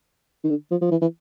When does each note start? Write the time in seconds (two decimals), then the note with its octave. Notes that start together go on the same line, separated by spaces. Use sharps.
0.44 D#3
0.50 D3
0.71 F3
0.82 F3
0.91 E3
1.02 E3